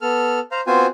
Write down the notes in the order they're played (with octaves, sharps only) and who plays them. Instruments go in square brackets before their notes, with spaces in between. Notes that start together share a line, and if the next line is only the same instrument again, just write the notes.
[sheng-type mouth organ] B3 A4 F6
C5 F5 A#5
B3 C4 F4 F#4 C5 G#5